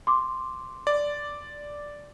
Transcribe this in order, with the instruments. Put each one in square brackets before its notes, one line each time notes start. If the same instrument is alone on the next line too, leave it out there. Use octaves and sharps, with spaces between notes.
[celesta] C6 D6
[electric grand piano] D5